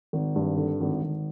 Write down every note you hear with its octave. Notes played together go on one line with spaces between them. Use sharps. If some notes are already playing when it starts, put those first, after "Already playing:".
G#1
G2
D3
G#1
G#1